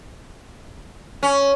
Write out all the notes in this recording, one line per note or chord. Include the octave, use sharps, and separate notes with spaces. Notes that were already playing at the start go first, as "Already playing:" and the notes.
C#4